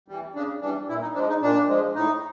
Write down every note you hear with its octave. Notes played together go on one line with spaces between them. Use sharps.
E3 G3
C#3 D4
E3 G3 D4
A#2 E4
D#4
F3 G#3 D4
D#4
A#2 D4
F3 G#3
A2 D#4